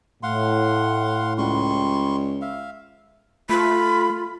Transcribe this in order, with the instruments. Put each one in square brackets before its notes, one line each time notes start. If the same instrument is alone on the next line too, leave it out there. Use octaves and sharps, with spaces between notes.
[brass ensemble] A2 [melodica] F5 F#5 C6
[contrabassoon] C#2 [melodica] G3 C6 C#6
[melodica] E5 F5
[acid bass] A3 [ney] F4 [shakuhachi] B5